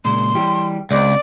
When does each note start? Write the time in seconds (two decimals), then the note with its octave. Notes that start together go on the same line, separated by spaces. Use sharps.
0.05 A#2 C#3 G#3 C6
0.35 E3 G3 G4
0.91 C#2 G#3 C4 D5